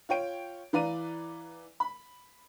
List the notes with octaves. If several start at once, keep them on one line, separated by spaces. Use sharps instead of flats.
F4 C#5 G5 D7
E3 B4 D5 F5 A#5 D#7
B5